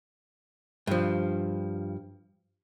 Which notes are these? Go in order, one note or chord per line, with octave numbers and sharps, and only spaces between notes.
G2 F3